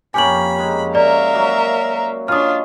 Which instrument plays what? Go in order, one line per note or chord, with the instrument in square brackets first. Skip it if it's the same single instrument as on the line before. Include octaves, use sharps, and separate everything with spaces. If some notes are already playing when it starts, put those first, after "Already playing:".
[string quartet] F2 B5 [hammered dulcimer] A#3 C#4 G4 [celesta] G#5 F#7
[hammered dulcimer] G#3 A#5
[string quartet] A#4 E5 F5 [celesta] D5
[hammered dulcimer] F#3 A#3
[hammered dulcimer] C#4 D#5 F5 [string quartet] D4 F4 [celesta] D#6 F6